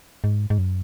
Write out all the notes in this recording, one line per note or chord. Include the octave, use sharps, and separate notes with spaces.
G#2
G#2
F#2